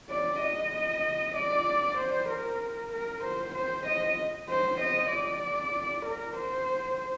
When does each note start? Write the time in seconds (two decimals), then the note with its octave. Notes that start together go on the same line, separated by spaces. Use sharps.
0.10 D5
0.41 D#5
1.36 D5
1.98 C5
2.29 A#4
2.93 A#4
3.24 C5
3.55 C5
3.86 D#5
4.49 C5
4.81 D#5
5.12 D5
6.06 A#4
6.37 C5